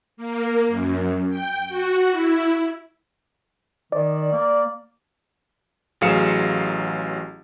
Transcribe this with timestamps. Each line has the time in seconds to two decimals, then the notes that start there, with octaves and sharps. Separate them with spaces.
0.17 A#3
0.68 F#2
1.30 G5
1.69 F#4
2.11 E4
3.92 D#3 D5
4.32 A#3
6.01 A1 F#3 G#4 F5 C#7 E7